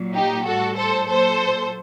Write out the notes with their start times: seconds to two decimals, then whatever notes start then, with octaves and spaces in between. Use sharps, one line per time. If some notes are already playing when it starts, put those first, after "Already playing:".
Already playing: A#2 F#3
0.15 D#4 G4
0.45 A2 G3 F#4 A4
0.77 A4 C5
1.08 A#2 F#3 A4 C5